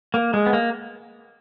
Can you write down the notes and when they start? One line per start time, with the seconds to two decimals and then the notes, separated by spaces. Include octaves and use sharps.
0.14 A#3
0.34 G#3
0.46 B3
0.53 A#3